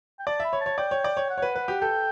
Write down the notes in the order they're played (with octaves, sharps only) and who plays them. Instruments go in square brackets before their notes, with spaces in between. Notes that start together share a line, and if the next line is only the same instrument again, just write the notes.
[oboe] G5
[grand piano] D5 [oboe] A5
[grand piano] E5 [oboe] B5
[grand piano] C#5
[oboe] A5
[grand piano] C#5
[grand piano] D5 [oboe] G5
[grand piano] C#5
D5
C#5
[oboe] F#5
[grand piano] C#5
B4
B4
G4
[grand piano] A4 [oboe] G5